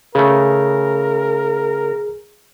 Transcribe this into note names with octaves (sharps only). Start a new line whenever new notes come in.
C#3 A3 G#4 A#4